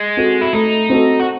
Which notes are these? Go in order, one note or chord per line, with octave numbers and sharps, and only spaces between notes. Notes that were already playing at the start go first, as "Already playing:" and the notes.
Already playing: G#3
C4 F#4 A4
E4
A3 D#4
C4 F#4 A4
F#4